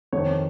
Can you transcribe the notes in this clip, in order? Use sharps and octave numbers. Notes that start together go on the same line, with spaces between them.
F2 C3 D#3 C#5